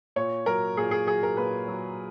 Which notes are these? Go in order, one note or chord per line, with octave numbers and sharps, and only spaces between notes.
A#2 C#5
F#3 A#4
A#2 G#4
G#4
F#3 G#4
A#4
A#2 B4
F#3